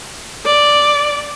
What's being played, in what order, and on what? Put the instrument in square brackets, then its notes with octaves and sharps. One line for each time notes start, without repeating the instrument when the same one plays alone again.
[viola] D5